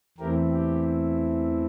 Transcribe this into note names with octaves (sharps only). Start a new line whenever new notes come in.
E2 E3 A3 C4 E4 G4 A#4
G4